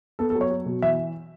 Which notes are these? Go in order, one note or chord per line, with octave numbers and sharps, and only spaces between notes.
B3 A4
A4
F#3
C#5
F#3
B2
E3 E5